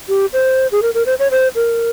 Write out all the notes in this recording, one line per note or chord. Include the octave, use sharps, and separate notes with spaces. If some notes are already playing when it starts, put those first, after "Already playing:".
G4
C5
G#4
A#4
A#4
C5
C#5
C5
A#4